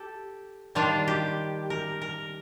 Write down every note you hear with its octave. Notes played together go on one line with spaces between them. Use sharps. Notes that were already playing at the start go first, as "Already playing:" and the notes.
Already playing: G4 A4
D#3 G3 D4 F4
G4
A#4
A#4